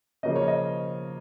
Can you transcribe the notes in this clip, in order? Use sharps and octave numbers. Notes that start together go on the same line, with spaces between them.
C#3 F3 A#3 C#4 D#5
C#5
D#5